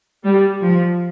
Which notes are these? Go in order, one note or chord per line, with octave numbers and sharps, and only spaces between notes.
G3
F3